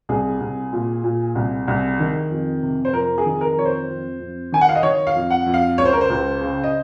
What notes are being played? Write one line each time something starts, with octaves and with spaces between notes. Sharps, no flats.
C2 G#4
C2
A#2
A#2
C2
C2
D#3
F2
C3
C5
F2 A#4
G#4
D#3
A#4
F2 C#5
C5
F2
F2
D#3 G#5
F#5
F5
D#5
D#3 C#5
F5
F2
F#5
F2
F5
C#2 C#5
C5
A#4
C5
C#2
C#3
D#5